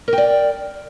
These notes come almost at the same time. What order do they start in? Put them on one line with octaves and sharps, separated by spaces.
A#4 G5 D5